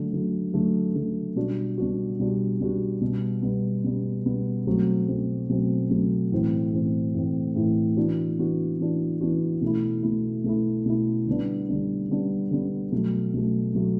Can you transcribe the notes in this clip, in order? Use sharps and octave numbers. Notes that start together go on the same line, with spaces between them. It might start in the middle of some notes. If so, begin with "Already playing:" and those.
Already playing: D3 F#3 A3
D3 F#3 A3
D3 F#3 A3
D3 F#3 A3
B2 G3 D4 F#4
B2 G3 D4 F#4
B2 G3 D4 F#4
B2 G3 D4 F#4
B2 G3 B3
B2 G3 B3
B2 G3 B3
B2 G3 B3
B2 F#3 A3 C4
B2 F#3 A3 C4
B2 F#3 A3 C4
B2 F#3 A3 C4
A2 E3 A3 C4
A2 E3 A3 C4
A2 E3 A3 C4
A2 E3 A3 C4
E3 B3 D4 F#4
E3 B3 D4 F#4
E3 B3 D4 F#4
E3 B3 D4 F#4
B2 A3 E4
B2 A3 E4
B2 A3 E4
B2 A3 E4
D3 G3 B3 D4
D3 G3 B3 D4
D3 G3 B3 D4
D3 G3 B3 D4
B2 F#3 A3
B2 F#3 A3
B2 F#3 A3